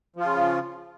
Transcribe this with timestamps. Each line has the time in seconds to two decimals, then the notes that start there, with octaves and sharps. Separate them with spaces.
0.16 F3
0.20 F4
0.24 C#3